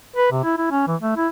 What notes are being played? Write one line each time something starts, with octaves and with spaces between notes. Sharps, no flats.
B4
C3
E4
E4
C#4
E3
A3
E4